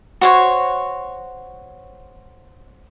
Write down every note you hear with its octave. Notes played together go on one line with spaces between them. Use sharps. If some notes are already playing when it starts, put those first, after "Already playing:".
F#4 C5 C#5